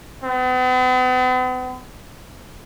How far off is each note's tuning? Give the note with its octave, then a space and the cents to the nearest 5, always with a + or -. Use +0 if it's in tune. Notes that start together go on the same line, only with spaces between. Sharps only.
B3 +45